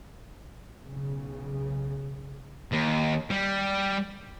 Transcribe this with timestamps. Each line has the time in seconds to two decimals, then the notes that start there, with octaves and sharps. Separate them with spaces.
0.82 B1 C#3
2.73 D#2
3.30 G3